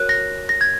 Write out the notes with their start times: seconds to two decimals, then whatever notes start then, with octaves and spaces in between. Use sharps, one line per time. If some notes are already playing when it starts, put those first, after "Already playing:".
Already playing: F#4 A#4 C#5 F#6
0.09 A#6
0.49 A#6
0.61 G#6